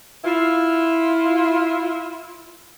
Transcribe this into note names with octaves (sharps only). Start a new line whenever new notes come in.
E4 F4